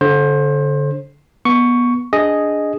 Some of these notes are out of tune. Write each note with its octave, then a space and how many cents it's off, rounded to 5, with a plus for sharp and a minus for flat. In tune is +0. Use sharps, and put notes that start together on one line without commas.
D3 -25 C5 +25
B3 -20 C#6 +5
D4 -10 G#4 +0 D#5 +0